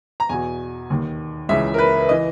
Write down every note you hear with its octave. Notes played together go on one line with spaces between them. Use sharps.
A#5
E2 B2 G#5
D#2 D#3
C#2 C#3 E3 E5
A#4
B4
E3 D#5